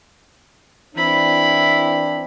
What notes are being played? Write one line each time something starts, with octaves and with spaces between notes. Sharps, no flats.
E3 C4 D4 E4 B5